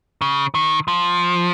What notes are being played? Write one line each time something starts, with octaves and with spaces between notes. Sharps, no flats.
C#3
D#3
F3